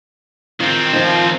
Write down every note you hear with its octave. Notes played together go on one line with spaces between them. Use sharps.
D#3 C4 F4
F3 D#4 F4